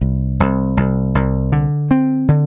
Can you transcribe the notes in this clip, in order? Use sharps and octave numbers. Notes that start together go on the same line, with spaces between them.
C2
C2
C2
C2
D3
C4
D3